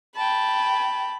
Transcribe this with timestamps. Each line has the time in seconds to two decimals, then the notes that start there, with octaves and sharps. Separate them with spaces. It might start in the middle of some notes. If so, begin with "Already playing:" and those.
0.16 G5 A5 B5